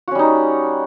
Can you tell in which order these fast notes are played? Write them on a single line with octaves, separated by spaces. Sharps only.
F#4 C#4 G3 D#4